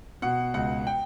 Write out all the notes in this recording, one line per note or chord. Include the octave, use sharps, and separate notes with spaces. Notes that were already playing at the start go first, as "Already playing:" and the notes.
B2 F#5
C#2 F#5
G5